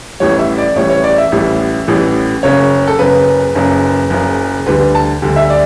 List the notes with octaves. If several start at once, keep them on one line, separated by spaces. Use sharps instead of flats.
A1 A2 E3 G3 C#5
E5
D5
A1 A2 E3 G3 C#5
C#5
D5
E5
A1 A2 E3 G3
A1 A2 E3 G3
F#1 F#2 C#3 C#5
A4
F#1 F#2 C#3 B4
F#1 F#2 C#3
F#1 F#2 C#3
D2 D3 G3 B4
A5
D2 D3 G3
E5
E5
D5